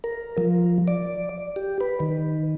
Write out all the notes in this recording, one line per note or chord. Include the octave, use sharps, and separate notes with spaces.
A#4
F3
D5
G4
B4
D#3